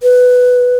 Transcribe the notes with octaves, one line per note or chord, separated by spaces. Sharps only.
B4